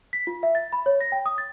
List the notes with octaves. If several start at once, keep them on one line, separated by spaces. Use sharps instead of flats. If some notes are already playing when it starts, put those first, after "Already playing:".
B6
F4
E5
A6
B5
C#5
A#6
G5
D#6
A6